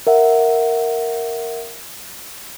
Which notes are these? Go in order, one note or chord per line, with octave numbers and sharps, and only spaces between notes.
A#4 E5 F#5